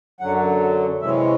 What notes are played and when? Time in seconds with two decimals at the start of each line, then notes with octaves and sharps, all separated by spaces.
0.20 F#2 D3 F#3 F#5
1.01 C3 E3 G#3 C#4 E5